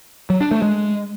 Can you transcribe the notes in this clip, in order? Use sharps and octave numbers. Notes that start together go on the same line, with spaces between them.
F#3
D4
A3
G#3